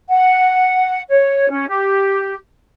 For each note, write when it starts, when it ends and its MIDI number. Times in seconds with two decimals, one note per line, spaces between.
0.09 1.01 78
1.10 1.49 73
1.50 1.69 61
1.69 2.35 67